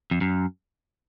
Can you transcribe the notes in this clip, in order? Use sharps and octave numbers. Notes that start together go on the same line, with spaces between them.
F2
F#2